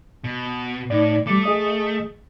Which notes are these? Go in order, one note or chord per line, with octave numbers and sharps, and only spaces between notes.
B2
A2 D#4 D5
G3 A3 D6
G#4 D#5 D#6